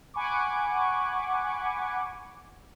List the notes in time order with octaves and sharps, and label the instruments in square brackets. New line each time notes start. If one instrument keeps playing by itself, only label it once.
[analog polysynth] F#5 G#5 B5 C#6 D6